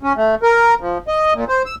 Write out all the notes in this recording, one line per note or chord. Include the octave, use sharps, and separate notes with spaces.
C#4
A3
A#4
F3
D#5
A#2
C5
E6